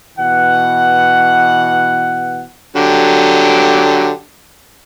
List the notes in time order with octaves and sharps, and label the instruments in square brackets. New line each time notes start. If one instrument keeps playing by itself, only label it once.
[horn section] B2 E3 F#5
[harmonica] D3 F#3 G4